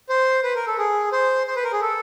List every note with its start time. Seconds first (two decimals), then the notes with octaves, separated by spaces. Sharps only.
0.09 C5
0.43 B4
0.55 A#4
0.67 A4
0.78 G#4
1.12 C5
1.47 C5
1.56 B4
1.64 A#4
1.73 G#4
1.81 A4